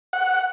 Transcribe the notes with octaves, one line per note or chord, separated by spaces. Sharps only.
F#5